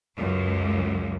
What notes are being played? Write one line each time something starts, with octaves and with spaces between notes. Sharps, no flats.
C#2 F#2